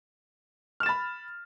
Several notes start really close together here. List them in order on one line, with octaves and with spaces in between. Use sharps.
F6 E7 A6 B5